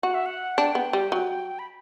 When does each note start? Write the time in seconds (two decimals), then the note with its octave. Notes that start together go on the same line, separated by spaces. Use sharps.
0.03 F#4 F#5
0.14 E5
0.26 F#5
0.57 D4 G5
0.75 B3
0.93 G3
1.12 F#3
1.59 B5